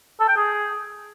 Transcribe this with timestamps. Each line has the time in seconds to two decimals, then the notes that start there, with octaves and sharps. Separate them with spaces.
0.20 A4
0.28 G5
0.37 G#4